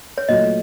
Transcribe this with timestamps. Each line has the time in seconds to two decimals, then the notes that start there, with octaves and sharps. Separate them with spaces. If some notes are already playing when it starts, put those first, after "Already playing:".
0.18 C#5
0.28 A#2 F#3 A3 D#5